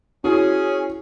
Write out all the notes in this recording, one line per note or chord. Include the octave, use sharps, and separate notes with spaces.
C#4 E4 F#4 G#4